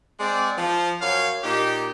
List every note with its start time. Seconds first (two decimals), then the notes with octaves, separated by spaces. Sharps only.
0.20 G#3 C4 D5
0.58 F3
1.01 F#2 C#5 F5
1.43 A#2 D#4 G4